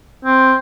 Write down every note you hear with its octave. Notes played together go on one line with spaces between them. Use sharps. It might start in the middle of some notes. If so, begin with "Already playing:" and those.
C4